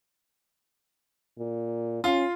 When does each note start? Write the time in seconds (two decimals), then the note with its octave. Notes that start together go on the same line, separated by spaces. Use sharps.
1.38 A#2
2.04 C#4 F4